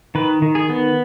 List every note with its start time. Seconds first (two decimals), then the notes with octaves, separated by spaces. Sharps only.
0.15 D#3 B4
0.42 D#3
0.55 G#4
0.70 B3